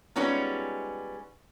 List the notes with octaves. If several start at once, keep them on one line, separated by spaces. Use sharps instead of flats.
G3 G#3 B3 C#4 D#4 F4